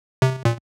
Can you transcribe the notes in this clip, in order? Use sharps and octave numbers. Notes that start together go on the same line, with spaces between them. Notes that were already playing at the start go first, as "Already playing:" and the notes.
C3
A#2